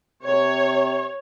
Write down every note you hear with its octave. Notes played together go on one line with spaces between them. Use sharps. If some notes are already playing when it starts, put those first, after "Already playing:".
C3 C#5